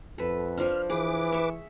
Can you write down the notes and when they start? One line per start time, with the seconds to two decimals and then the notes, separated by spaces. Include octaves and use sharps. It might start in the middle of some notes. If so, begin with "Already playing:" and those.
0.18 F2 A4 B4
0.58 F3 D4 F6
0.90 E3 G#4 B4 D6
1.32 E5 C#6